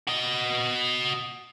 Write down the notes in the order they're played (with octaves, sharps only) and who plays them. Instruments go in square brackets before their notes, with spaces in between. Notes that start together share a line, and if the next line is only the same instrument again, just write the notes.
[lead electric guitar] F#4 D#5